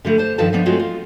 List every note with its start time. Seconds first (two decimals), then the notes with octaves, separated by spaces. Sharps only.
0.05 D3 G3 A3
0.18 C5 A5
0.38 G2 D#3 F3 A4 B4 A5
0.53 F3 B3 D4
0.66 F#3 G#3 A3 C4 F4 F#4
0.79 F4